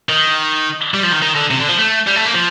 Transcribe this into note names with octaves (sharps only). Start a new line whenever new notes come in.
D#3
G3
F3
D#3
D#3
D3
C3
D3
F3
A3
G3
A3
A#3
F3